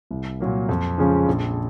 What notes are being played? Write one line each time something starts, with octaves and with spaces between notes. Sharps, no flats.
C2
A#2 F#3 A#3
F2
C#3 F3 G#3 C#4
A#1